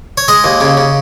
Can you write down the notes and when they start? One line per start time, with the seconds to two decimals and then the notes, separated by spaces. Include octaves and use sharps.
0.18 C#5
0.28 G#3 D#5
0.44 D#2
0.60 C#3
0.77 C#3